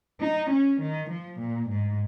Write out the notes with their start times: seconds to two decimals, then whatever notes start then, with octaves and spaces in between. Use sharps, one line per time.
0.20 D#4
0.50 C#4
0.80 D#3
1.09 F3
1.39 A#2
1.69 G#2